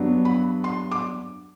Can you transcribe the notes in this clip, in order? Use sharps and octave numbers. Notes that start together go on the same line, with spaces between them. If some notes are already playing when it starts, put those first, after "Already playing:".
Already playing: G2 F#3 B3 D4
B5
C6
D6